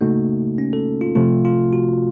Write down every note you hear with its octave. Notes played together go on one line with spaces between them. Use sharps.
C#3 A3 A#3 D#4 F#4
C#4
A4
F4
C3 F3 A3 F4
F4
F#4